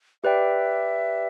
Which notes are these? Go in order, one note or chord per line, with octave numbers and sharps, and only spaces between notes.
G4 B4 D5 E5 G5